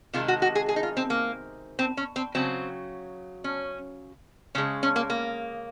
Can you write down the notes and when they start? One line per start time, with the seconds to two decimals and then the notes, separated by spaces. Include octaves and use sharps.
0.13 C3 D#3 G#3 F4
0.28 F#4
0.42 F#4
0.55 G#4
0.68 G#4
0.76 D#4
0.83 F4
0.97 C4
1.10 A#3
1.79 C4
1.97 C#4
2.16 C4
2.35 C#3 F#3 C4
3.44 C#4
4.55 C#3 G#3 C#4
4.83 C#4
4.96 A#3
5.10 A#3